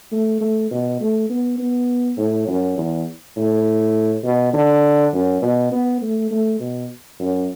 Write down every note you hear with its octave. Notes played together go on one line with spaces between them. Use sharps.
A3
A3
B2
A3
B3
B3
A2
F#2
E2
A2
B2
D3
F#2
B2
B3
A3
A3
B2
F#2